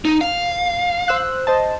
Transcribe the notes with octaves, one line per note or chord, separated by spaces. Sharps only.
D#4
F5
C5 E6 F#6
C5 D#5 A5